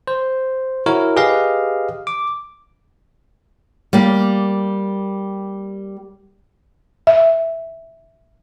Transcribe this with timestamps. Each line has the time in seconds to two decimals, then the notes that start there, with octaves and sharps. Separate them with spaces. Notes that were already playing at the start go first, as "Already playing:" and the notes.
0.08 C5
0.86 E4 F#4 A#4 C#5
1.16 G4 G#4 B4 D#5 F5
2.07 D6
3.93 G3 A#3
7.07 E5